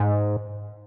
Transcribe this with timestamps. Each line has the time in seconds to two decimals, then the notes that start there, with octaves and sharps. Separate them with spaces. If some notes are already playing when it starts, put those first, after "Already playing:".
Already playing: G#2